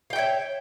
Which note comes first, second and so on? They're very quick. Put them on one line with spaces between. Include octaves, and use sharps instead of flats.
F5 G5 E5 C#5